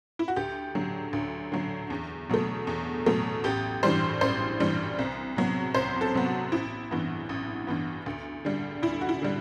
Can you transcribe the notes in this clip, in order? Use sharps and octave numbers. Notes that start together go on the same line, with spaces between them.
E4
F#4
D2 G4
D3 F#3
D2
D3 F#3
E2
B2 F#3 A3
E2
B2 F#3 A3
A1 G4
G2 E3 G3 C5
A1 C5
G2 E3 G3
C2
C3 F#3 B3
C2 C5
A4
C3 F#3 B3
F#4
A1 E4
G2 E3 B3
A1
G2 E3 B3
D2
D3 G3
D2 E4
F#4
E4
D3 G3